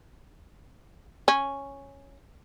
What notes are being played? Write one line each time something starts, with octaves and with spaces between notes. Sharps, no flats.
C#4